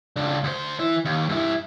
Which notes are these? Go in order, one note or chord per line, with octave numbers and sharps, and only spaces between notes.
C#2 D4
D2 C5
E3 E4
D#2
G2 E4